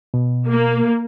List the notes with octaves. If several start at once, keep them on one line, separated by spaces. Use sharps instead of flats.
B2
A#3